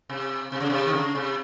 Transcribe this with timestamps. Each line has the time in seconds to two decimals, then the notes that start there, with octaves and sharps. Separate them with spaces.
0.09 C3
0.52 C3
0.60 C#3
0.70 C3
0.85 D#3
0.93 C#3
1.15 C3